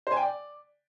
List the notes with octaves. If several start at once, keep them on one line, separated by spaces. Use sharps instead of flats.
C5
G#5
G5
D5